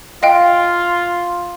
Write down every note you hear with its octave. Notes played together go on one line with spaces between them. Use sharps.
F4 D#5 F5 G5